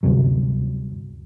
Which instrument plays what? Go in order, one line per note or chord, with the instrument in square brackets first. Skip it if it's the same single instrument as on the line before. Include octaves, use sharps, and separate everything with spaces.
[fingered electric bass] D2 G2 C3 F#3